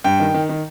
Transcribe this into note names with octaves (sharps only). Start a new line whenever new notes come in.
G2 G5
D#3
D#3
D#3